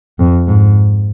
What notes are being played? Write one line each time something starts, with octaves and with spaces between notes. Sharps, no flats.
F2
G#2